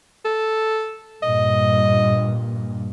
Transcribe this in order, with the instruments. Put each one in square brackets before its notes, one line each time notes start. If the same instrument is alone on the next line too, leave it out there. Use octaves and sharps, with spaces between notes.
[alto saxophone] A4
[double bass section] G2 A#2 [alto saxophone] D#5